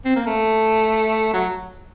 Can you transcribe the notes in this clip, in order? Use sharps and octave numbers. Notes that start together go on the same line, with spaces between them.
C4
A#3
A3
F#3